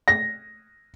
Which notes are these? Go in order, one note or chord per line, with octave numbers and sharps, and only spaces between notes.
A#6